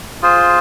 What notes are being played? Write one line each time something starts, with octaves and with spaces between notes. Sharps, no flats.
F4 G#4 C5